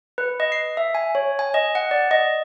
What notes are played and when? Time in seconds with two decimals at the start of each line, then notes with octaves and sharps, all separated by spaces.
0.18 B4
0.40 D#5
0.52 C7
0.77 E5
0.95 G#5
1.15 C#5
1.39 G#5
1.54 D#5
1.75 F#5
1.91 D5
2.11 D#5